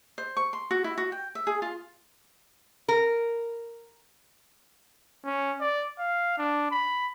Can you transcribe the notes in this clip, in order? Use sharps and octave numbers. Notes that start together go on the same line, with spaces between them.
C5
C#6
C6
F#4
E4
F#4
G5
E5
G#4
F4
A#4
C#4
D5
F5
D4
B5